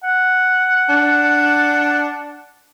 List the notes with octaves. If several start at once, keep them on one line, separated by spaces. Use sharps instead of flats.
F#5
D4